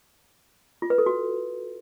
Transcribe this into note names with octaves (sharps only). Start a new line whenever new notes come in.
F4
B4
A4
F#4